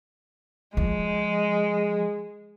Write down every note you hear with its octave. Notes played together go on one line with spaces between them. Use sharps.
F3 G#3